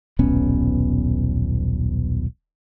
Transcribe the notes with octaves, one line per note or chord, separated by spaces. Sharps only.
D#1 B1 B3 C#4